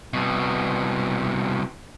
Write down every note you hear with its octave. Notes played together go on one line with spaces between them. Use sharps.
C2 B2